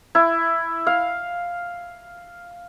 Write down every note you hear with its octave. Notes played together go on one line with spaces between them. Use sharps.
E4
F5